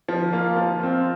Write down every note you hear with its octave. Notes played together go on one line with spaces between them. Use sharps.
F3
A#3 F4
F3
C4 F4